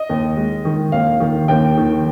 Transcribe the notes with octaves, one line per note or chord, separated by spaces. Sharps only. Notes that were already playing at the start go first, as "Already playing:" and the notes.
Already playing: D#5
D#2
G#3
D#3
D#2 F5
D#3
D#2 G5
D#3